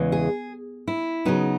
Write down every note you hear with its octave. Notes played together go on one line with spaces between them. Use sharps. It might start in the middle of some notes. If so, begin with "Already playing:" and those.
Already playing: E2 C#3 E3 G#3
G#4
E4
C#3 F#3 B3 D#4